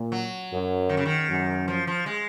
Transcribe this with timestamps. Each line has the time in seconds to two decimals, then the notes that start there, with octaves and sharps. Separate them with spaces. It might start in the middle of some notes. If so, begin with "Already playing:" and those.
Already playing: A#2
0.12 F#3
0.51 F#2
0.89 D#3
0.97 C#3
1.06 D#3
1.29 F#2
1.68 F3
1.87 F3
2.06 G#3